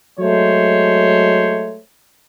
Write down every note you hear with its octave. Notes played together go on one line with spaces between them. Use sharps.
F#3 G#3 A3 C5 C#5